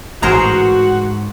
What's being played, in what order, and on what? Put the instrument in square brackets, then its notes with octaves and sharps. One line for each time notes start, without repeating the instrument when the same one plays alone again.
[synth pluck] A1 A#5 [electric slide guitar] G#2 G#5 [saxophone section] F#4 [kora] G#4 A#4 C5